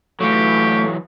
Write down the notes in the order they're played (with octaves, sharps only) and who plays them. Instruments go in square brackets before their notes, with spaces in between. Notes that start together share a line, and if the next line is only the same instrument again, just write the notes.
[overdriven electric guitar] E3 F#3 [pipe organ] A3 [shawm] G4 [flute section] F5 C#6